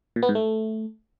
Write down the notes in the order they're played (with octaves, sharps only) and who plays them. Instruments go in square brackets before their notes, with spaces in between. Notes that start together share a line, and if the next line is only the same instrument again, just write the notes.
[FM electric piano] A#2
B3
G#2
A3